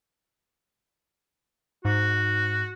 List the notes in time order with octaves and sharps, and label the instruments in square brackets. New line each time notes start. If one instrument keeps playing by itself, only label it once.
[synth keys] G#2 [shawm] F#4